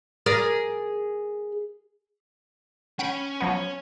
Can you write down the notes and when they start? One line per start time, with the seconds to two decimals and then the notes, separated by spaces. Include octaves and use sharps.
0.26 G#4 A#4 D5
2.99 C#4 C#5 F#5 G5 B5
3.40 F3 F#3 B3